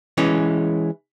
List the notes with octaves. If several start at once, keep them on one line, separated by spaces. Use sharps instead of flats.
E3 G#3 C#4